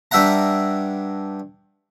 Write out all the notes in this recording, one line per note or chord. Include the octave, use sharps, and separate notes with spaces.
G2 D4 E5 F#5 A#5